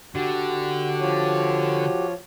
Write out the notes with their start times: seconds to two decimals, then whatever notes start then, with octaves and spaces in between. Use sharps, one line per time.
0.15 D3 F#4 G4
1.00 F3 F4 C#5